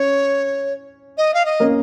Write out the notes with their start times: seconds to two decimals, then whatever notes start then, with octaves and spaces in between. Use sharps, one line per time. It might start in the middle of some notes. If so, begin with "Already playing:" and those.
Already playing: C#4 C#5
1.17 D#5
1.34 F5
1.45 D#5
1.60 A#3 C#4